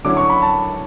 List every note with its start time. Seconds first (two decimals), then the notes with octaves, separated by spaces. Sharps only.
0.05 D3 F#3 C#4 E4 D6
0.17 C#6
0.29 B5
0.42 A5